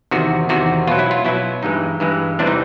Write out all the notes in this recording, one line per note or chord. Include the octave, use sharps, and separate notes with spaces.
E2 C3 D#3 F#4
E2 C3 D#3 F#4
B2 F#3 F4
E4
F4
B2 F#3 E4
G2 E3 G#3 D#4
G2 E3 G#3
E2 C3 E3 G3 D4
D#4